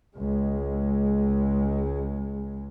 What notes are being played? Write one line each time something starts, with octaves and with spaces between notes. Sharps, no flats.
C#2 G#3